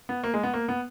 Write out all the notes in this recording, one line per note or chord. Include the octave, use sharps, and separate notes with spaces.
B3
A#3
G#3
B3
A#3
B3